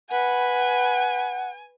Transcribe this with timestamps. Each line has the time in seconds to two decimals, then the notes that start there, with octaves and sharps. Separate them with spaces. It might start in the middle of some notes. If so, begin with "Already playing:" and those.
0.10 B4 F#5 G#5 B5